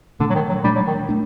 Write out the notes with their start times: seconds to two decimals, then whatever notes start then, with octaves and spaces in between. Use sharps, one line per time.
0.20 A#2 D3 A3 D4
0.30 F#3
0.35 D#3
0.49 F#3
0.64 A#2 G3 A3 D4
0.76 F#3
0.87 D#3
1.09 A3 D4